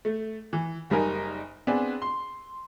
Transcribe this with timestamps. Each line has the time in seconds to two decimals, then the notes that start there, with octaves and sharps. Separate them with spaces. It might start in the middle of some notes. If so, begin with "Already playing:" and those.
0.05 A3
0.53 E3
0.90 F#1 G3 D#4 A#4 G#5
1.67 B3 C4 D4 G#4
2.02 C6